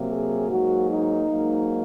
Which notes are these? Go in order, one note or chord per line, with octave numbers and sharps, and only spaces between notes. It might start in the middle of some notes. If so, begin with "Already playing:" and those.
Already playing: C3 F#3 A#3
G#4
G#2 F#3 A#3 F#4
D#4
G#2 F#3 A#3